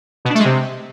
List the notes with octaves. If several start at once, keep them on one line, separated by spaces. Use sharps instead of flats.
B2
D4
A3
G#3
C3